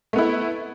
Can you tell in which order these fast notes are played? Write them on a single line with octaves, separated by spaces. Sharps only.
A3 B3 E4